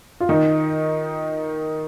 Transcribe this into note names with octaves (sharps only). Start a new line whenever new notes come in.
F4
D#3 D#4